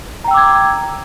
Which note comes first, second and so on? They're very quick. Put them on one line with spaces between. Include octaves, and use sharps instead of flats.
A#5 G5 E6 D6 G#6